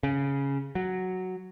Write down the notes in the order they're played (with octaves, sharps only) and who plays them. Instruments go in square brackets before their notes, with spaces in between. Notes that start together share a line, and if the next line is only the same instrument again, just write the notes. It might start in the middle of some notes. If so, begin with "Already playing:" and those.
[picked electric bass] C#3
F#3